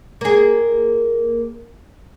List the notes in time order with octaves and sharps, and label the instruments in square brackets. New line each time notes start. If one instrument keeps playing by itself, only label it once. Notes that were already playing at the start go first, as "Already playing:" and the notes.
[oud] A#3 G#4